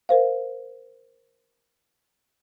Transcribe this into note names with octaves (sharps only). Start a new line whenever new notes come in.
A#4 C5 F5